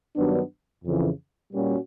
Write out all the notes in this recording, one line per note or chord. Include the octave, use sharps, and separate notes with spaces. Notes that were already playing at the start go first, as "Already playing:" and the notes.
G2 D#3 F#3 B3 D4
F2 C#3 E3
A#2 G3 A#3 C#4 F#4